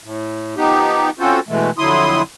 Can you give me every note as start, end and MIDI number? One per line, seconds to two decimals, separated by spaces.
0.04 0.55 45
0.57 1.10 53
0.57 1.10 59
0.57 1.10 63
0.57 1.10 67
1.19 1.40 60
1.19 1.40 61
1.19 1.40 65
1.19 1.40 66
1.19 1.40 69
1.19 1.40 72
1.49 1.71 47
1.49 1.71 52
1.49 1.71 56
1.49 1.71 57
1.78 2.22 41
1.78 2.22 50
1.78 2.22 54
1.78 2.22 64
1.78 2.22 84
1.78 2.22 87